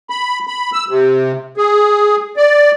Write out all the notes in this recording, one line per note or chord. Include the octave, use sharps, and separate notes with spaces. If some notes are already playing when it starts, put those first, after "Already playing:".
B5
B5
E6
C3
G#4
D5